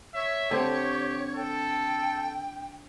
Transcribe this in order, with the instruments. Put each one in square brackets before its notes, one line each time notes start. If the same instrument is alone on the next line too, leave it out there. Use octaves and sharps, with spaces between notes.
[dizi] C#5 [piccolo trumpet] E5
[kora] D3 C4 [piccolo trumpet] G4
[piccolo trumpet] A4 [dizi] G5